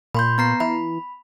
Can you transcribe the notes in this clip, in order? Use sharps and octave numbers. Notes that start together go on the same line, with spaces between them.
A#2 B5 C6 G6
B3 A#5 C7
E3 B5